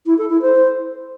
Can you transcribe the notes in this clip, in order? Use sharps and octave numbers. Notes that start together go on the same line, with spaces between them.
E4
A4
E4
C5